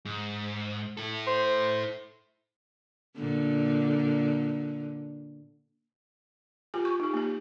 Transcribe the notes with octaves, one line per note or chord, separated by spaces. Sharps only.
G#2
E4 A4
C5
A#2 D3
F4 G4 G#5
C#6
D#4 G4
A#3 G4